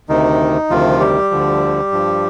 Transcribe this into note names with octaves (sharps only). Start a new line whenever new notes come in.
D2 C3 D#3 D#4
D2 C3 D#3 F3 F4
G3 G4
D2 D3 F3
G2 F3